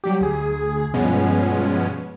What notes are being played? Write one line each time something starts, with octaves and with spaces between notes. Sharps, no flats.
F#3 G3 G4
D2 G#4
G2 B2 F3 G#3 B3 C#4